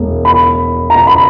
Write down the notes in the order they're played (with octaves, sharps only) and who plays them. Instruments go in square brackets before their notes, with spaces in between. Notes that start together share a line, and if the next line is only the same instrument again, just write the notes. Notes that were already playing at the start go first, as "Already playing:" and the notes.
Already playing: [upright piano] E1
[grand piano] B5
A#5
B5